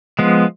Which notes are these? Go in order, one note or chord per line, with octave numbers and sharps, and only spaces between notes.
F3 G#3 B3